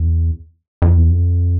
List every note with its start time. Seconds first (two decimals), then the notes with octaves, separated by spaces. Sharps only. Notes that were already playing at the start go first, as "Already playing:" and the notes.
Already playing: E2
0.82 F2
0.96 E2
1.10 F2